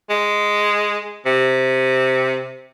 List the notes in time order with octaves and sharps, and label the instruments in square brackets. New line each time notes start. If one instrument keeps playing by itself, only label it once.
[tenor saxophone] G#3
C3